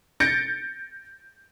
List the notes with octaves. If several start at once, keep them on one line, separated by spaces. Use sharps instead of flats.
G6 A6 A#6 C#7 D7